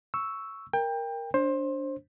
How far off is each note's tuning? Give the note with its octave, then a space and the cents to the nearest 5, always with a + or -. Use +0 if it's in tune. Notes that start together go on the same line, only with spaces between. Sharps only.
C#6 +0 E6 +0
A#4 +0 G5 +25
D4 -15 C5 +20